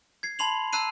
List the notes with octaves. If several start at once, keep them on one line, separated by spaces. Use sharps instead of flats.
G#6 C7
A5 B5 C6 C7 F7 F#7
A5 A#5 E6 F#6 C7 D#7